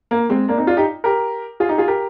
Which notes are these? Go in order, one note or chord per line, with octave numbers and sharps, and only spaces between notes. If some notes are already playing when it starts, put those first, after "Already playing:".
A#3
G#3 C4
A#3 D4
C4 D#4
D4 F4
D#4 G4
G4 A#4
F4 G#4
D#4 G4
F4 G#4
G4 A#4